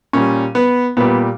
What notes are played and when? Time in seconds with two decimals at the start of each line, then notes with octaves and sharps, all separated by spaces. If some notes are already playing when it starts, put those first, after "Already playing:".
0.13 A#2 G3 C#4
0.55 B3
0.97 A#2 G3 B3